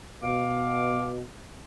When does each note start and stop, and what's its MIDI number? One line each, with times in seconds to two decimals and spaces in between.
0.23 1.21 47
0.23 1.11 77
0.23 1.11 86